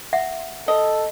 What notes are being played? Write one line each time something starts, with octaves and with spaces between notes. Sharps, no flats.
E5 F#5
A4 D#5